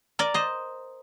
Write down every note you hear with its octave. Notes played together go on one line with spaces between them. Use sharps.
A#4 D5
C5 D#5